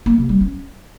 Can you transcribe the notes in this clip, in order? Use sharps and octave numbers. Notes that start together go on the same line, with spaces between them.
A#3
C3
G3
C#4